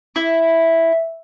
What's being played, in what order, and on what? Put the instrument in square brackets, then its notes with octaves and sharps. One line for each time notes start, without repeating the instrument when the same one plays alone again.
[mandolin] E4